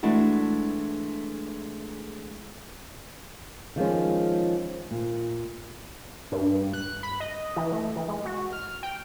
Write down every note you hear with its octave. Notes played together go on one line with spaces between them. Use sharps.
E3 G#3 A3 D4 E4 F#4
D#3 F3 G#3 C#4
A#2
G2
F#6
B5
D#5
E3
A3
E3
G#3
F#4
F6
G5